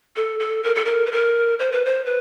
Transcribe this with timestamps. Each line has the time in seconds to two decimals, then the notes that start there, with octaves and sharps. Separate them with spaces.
0.16 A4
0.40 A4
0.63 A#4
0.75 A4
0.85 A#4
1.06 B4
1.12 A#4
1.59 C5
1.72 B4
1.85 C5
2.06 B4